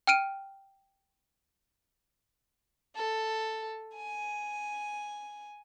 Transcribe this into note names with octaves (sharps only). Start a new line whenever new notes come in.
G5 F6 D7 D#7
A4
G#5